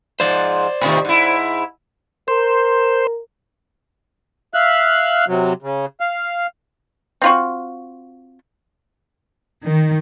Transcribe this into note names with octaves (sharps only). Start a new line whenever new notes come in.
G#2 F3 C5 D5
A2 C3 D#3
G#2 E4
A#4 C5
E5 F5 F#6
C3 F#3
C#3
F5
C4 F4 F#4
D#3